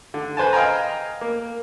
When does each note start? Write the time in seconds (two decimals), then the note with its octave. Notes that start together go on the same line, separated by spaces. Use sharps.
0.14 D3
0.37 B4 C5 G#5 A5
0.53 D#5 F5 G5 G#5 A#5
1.21 A#3